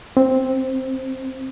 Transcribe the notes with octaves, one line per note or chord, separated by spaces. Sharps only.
C4